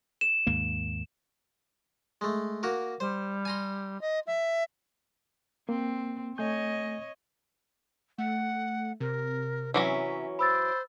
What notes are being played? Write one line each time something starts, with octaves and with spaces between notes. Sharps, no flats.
E7
D#2 G#2 A#3
G#3 A3
A#3 F#4 A#4
G3 C5
G#5 A#5 C6
D#5
E5
A#3 C4
A3 C#5 D#5 G#5 G6
A3 F#5
C3 A#4
E3 F#3 C#4 E5
C5 B5 D6 E6 A6